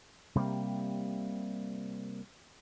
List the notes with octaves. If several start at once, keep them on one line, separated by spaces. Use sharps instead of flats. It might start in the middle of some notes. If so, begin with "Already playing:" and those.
C3 G3 G#3 A#3